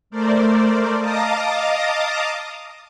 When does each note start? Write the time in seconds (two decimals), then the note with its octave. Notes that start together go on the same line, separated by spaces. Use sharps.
0.10 A3 A#4 C5 D5
0.99 D#5 F5 A5 A#5 D6 D#6